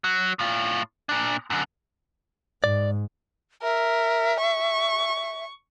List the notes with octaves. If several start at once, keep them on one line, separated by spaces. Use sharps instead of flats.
F#3
A2 F4
A#2 D4
F#2 D3
G#2 D5
A#4 E5
C#6